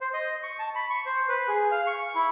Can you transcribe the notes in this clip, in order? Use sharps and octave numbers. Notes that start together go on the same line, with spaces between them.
C5
D#5
C#6
A5
B5
C#6
C5
B4
G#4
F5
C#6
E4